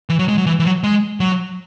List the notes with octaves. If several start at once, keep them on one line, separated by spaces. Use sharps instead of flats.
E3
F#3
G#3
F#3
E3
E3
F#3
G#3
F#3